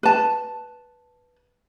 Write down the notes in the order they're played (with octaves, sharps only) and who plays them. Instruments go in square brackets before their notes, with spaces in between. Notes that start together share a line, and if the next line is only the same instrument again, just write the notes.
[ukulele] B4 A5